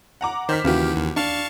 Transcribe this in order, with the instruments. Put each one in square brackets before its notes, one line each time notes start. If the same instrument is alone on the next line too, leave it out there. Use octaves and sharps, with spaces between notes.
[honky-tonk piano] F#5 A#5 D6
[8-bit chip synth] D#3 [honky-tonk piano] C5 F6 B6
[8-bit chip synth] D#2 G4 [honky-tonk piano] C#3 E3 F#4
[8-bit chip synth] D#2
[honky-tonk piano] D4 [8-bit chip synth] F5 A5 C#6